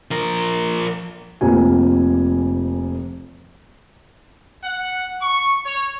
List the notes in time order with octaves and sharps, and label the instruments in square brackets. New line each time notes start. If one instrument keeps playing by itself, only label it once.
[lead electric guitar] F3 A#4
[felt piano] F1 F2 A#3 G4 G#5
[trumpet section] F#5
C#6
C#5